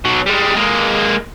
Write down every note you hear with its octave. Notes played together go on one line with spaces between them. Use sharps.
B2 F#3
G3 G#3
G#3 A#3